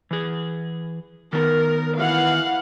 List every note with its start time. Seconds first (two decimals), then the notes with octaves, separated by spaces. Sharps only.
0.11 E3 G#4
1.33 D#3 B3 A#4
1.96 E3 F5 F#5